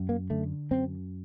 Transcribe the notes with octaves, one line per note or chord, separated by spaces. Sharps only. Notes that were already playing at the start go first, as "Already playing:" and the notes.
Already playing: F#2
A#3
D3 A3
F#2 C4